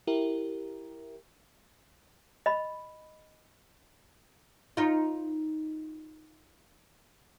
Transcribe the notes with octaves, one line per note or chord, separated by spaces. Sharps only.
E4 G4 A#4
D#5 B5
D#4 F4